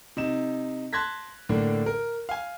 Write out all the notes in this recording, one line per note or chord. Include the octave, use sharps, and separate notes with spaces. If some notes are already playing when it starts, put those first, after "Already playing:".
C3 D#4 E7
A5 C6 F#6 G#6 A#6 B6
A2 D3 A#3 D4
A#4
F5 G#5